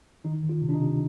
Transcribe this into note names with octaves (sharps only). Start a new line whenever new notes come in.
D#3 D#4
D#3
F4
C3
D4
D#4
C3